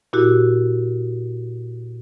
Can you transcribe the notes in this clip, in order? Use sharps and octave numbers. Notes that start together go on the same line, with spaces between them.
A#2 E4 F#4 G4